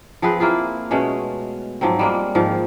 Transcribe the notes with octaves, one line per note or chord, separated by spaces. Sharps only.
F3 C4 G#4 B4
A#3 E4 F4 G#4
B2 G#3 A3 C#4
G#2 F3 F#3 C4
G3 G#3 A#3
G#2 D#3 F3